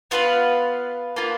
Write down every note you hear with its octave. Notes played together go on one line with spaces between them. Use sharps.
B3 F4 B4 F5
A#3 F4 B4